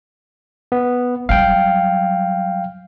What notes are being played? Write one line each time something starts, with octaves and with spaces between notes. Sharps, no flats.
B3
F#3 G3 F5 G5